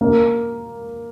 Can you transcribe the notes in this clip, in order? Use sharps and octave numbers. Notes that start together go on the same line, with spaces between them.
A#3